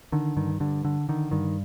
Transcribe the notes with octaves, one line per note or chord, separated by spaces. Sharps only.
D3 D#3
G2 D#3
G2 D3
D3
D3 D#3
G2 D#3